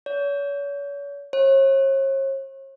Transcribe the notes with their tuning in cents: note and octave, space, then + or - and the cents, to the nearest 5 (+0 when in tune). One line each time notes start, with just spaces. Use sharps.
C#5 +40
C#5 -40